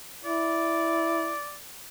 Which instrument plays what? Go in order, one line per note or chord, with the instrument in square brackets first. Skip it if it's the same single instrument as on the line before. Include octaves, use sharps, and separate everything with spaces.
[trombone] E4 [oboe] D5